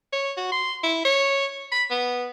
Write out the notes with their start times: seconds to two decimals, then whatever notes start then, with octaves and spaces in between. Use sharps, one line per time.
0.13 C#5
0.37 F#4
0.52 C6
0.83 E4
1.05 C#5
1.72 B5
1.91 B3